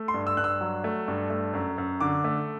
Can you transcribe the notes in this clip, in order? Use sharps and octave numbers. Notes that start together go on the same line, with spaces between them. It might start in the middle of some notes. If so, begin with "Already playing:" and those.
Already playing: A3
C6
G2
E6
G2 F#6
E6
F#3
A3
G2
A3
F#2
F#2
D3 D6
A3